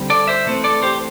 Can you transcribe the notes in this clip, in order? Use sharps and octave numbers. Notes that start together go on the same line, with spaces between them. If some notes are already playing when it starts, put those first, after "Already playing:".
Already playing: D3 G3 C4
A4 D5
C5 E5
E3 A3 C4
A4 D5
G4 C5